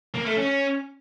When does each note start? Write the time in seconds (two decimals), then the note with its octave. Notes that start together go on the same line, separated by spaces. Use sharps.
0.14 A#3
0.25 A3
0.36 C#4